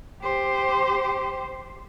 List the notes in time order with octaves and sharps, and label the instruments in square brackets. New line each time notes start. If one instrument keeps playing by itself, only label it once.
[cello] G4 C5